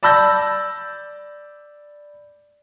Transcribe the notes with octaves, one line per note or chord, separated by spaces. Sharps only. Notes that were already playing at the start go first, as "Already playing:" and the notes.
D5 A5 B5 E6 G6 A#6